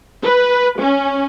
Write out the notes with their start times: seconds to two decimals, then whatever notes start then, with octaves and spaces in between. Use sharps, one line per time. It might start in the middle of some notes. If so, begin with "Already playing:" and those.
0.23 B4
0.80 C#4